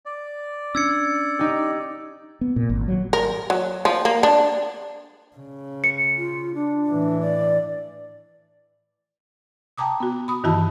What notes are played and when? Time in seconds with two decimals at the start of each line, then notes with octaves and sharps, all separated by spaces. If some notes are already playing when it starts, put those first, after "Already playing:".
0.05 D5
0.75 C#4 D4 E6 G#6 C#7
1.39 D#4 G4
2.41 B3
2.56 A#2
2.70 G#1
2.88 F#3
3.13 A#4
3.50 F#3
3.85 F3
4.05 A#3
4.23 D4
5.37 C#3
5.84 C#7
6.17 F4
6.54 D4
6.88 A2 E3
7.21 D5
9.78 G5 A5 A#5 D6 D#6
10.00 B3 F#4
10.28 B5 D#6
10.44 G2 D#3 E3 E4 F#4 A5